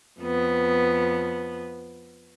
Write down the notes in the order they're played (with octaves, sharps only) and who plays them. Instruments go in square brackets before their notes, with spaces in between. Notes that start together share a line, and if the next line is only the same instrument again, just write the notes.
[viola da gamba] F2 B3